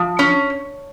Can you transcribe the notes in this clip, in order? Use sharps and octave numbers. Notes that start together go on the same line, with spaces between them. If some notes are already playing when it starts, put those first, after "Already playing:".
Already playing: F3
C#4